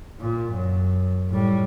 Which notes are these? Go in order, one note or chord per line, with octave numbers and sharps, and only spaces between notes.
A#2
F#2
A2 G3